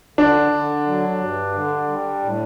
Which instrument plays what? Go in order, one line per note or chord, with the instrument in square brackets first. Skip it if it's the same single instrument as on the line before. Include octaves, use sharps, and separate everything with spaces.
[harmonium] D3 [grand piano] D4
[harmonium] D3
F#3
G2
D3
G3
A2